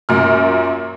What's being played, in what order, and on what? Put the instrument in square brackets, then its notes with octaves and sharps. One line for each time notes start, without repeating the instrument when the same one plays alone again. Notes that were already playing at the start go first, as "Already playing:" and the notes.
[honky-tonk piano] F#2 A#2 F6